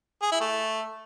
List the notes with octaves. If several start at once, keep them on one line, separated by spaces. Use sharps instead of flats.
G#4
E4
A3